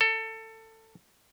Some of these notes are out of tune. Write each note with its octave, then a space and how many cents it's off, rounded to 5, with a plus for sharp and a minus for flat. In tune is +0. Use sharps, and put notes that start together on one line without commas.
A4 +20